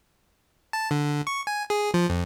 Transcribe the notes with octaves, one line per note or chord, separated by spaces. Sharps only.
A5
D3
C#6
G#5
G#4
F3
F2